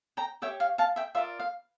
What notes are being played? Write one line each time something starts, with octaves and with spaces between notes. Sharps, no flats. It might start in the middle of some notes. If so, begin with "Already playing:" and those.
G5 A#5
G4 C#5 E5 G5
F5
F5 A5
E5 G5
F4 A#4 D5 E5
F5